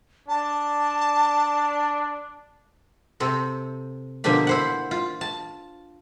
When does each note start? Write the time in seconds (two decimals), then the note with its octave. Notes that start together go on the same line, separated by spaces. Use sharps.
0.29 D4 A5
3.20 C3 C4 A4
4.24 B2 D3 F3 A#3 D4 G4
4.47 E4 C5 F#5
4.91 F4
5.21 A5